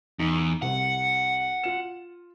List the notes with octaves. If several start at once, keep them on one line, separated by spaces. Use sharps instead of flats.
E2 D#4
C2 F#5
F4 E7